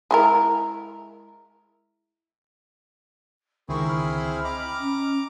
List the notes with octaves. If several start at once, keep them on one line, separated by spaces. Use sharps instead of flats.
G#3 E4 A#4
C#2 D3 D#3 C4 E4 G#4 A#4 C#6
B5 F6
D#5 G5 A#5 D6
C#4